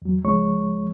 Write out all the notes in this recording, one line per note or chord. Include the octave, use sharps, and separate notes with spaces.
E2 F#3
C#2 F3 G#3 C#5 C#6